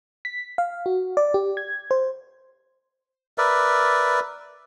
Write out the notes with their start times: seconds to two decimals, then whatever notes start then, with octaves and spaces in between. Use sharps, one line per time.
0.25 B6
0.58 F5
0.86 F#4
1.17 D5
1.34 G4
1.57 G#6
1.91 C5
3.38 A#4 B4 D5 E5